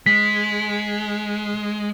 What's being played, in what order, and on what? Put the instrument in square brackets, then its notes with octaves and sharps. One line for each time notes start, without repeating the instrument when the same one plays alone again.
[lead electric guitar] G#3 [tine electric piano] B6